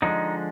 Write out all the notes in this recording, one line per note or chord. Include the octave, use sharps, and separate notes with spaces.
D3 F3 G#3 D#4